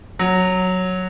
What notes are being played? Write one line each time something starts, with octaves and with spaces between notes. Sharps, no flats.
F#3